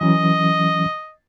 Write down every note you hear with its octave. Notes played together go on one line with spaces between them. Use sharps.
E3 F#3 C#4 D#5